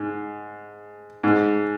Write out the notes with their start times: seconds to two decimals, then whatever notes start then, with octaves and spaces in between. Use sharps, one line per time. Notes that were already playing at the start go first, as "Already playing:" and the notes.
Already playing: G#2
1.24 G#2